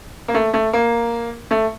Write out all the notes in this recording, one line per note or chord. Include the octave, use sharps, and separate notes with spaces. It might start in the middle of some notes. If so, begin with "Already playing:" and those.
A#3
A3
A3
A#3
A3